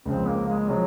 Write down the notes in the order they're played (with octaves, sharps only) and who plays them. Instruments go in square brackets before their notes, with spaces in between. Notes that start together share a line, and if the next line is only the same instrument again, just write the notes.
[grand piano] C#2 C#3 F3 [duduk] C4
[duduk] A#3
G#3
[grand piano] C#3 F3 [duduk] F#3